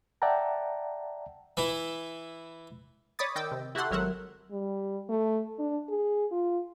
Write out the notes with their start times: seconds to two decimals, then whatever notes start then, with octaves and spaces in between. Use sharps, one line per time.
0.22 D5 E5 F#5 G5 A5 A#5
1.57 E3 E4
3.19 C#5 D5 B5 D#6 A6
3.35 D#3 D#5 G5 D6 E6
3.52 C3
3.75 E4 F#4 G4 A4 F#5 C6
3.91 G#1 F#3 A#4 E5 F#5
4.51 G3
5.09 A3
5.59 D4
5.89 G#4
6.32 F4